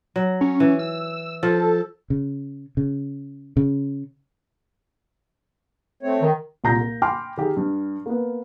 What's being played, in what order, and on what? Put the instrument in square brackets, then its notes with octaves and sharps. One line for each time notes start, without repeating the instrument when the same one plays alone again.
[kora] F#3
[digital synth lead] C#4
[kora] E3
[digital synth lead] E6
[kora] F3 [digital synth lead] A4
[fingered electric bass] C#3
C#3
C#3
[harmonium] A3 C4 C#5
[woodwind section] D#3
[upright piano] C2 A#2 A#5 G6 A#6
A#3
G5 G#5 B5 C6 D6 F6
D#3 G4 G#4
G2
A#3 B3